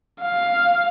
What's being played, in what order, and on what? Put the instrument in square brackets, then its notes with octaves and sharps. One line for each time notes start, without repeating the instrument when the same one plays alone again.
[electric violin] F5